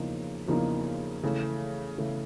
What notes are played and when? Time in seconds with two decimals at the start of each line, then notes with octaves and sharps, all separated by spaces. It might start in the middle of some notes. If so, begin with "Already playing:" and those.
Already playing: E2 C#3 F3 A#3 D#4
0.47 E2 C#3 F3 A#3 D#4
1.23 C#3 E3 A3
1.98 C#3 E3 A3